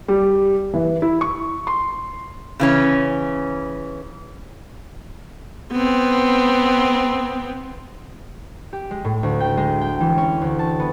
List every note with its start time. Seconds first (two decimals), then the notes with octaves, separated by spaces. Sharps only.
0.08 G3
0.74 E3
1.02 E4
1.21 C#6
1.67 C6
2.60 C#3 E3 C#4
5.72 B3 C4
8.73 G4
8.91 G#3
9.05 A2
9.23 D2
9.40 G5
9.57 G#3
9.81 G5
10.00 E3
10.18 C#4
10.41 D2
10.59 A5
10.80 B3